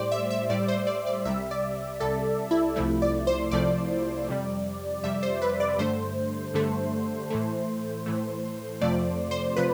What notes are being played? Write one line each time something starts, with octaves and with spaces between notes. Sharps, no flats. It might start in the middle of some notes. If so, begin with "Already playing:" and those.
Already playing: A2 G3 C5 D5
E5
E5
A2 G3 D5
C5
D5
D5
C2 C3 G3 E5
D5
C2 C3 G3 A4
E4
C2 C3 F3 A3 E4
D5
C5
C2 C3 F3 A3 D5
F2 C3 G3
F2 C3 G3 E5
C5
B4
D5
G2 D3 A3 C5
G2 D3 A3
A2 E3 A3
A2 E3 A3
F2 C3 F3 A3 D5
C5
C3 F3 B4